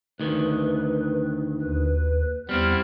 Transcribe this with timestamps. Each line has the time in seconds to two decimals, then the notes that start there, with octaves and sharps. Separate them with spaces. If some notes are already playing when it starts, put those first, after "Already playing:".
0.20 D2 D#3 B4
1.61 D#2 B4
2.49 E2 G3 B3 C4 E4 F6